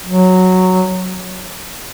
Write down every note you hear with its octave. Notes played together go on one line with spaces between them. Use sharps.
F#3